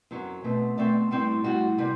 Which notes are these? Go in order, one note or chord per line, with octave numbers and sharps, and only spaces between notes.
F#2 F#3 C4
B2 A3 C4
B2 A3 C4 D5
A2 G3 C4
A2 G3 C4 F#4
C3 G3 C4